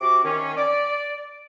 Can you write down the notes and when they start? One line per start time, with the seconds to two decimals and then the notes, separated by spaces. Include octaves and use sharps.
0.01 C3 F#4 D6
0.24 D#3 C#4
0.56 D5